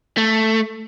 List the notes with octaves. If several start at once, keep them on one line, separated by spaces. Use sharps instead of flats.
A3